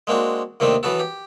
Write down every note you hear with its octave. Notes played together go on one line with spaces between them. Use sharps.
G#3 A#3 C4 D4 F#4
D#2 C3 D#3 A3 C4 D4
E3 F#3 B3 F#4 A4
G4